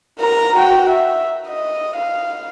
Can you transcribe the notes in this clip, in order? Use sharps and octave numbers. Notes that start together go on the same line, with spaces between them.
A#4 A#5
F#4 G5
E5
D#5
F5